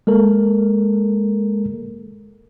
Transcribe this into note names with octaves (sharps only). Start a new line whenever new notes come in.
G#3 A#3 A4 A#4